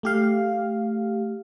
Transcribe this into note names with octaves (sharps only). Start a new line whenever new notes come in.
A3 G4 F5